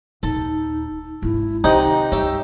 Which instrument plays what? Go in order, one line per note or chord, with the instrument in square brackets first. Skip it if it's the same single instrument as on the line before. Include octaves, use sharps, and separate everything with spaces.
[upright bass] D#1 [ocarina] D#4 [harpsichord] A4
[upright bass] G#1 D#4 [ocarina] E4
[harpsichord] C3 G4 F#5 [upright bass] D#3 F#3 [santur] D#4 [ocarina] D#5
[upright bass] G2 [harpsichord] G4 C#5 E5